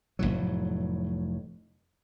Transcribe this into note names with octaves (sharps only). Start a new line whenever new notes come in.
F1 C#2 A2 F#3